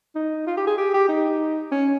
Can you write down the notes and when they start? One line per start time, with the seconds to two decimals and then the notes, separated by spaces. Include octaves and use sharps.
0.15 D#4
0.47 F4
0.57 G4
0.67 G#4
0.78 G4
0.94 G4
1.09 D#4
1.72 C#4